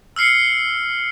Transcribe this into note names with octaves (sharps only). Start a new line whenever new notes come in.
E6 F6 C7 C#7